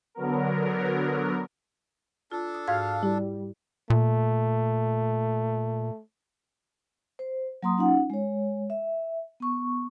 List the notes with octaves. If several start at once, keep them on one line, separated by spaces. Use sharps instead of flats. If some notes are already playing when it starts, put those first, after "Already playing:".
D3 F#3 B3 A#4
D4 F4 A4
D#6
G#2 F#4 F5 G#6
G3 E4
A#2 A3
C5
F#3 A#3 A#5 C6 D#6
C#4 D#4 F4 F#5
G#3 C#5
E5
B3 C#6